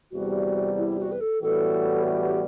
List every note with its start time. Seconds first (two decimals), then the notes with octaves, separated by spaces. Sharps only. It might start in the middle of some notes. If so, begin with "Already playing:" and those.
0.11 E2 C3 G3 F#4
0.77 E4
0.99 F#4
1.11 B4
1.20 A4
1.42 A2 E3 G3 B3 F#4 A4
2.07 G4
2.24 G4